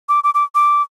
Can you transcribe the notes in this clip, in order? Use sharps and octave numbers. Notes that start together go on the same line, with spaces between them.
D6
D6
D6
D6